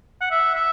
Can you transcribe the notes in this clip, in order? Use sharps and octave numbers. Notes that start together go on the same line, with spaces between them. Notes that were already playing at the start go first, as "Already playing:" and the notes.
F#5
E5
E5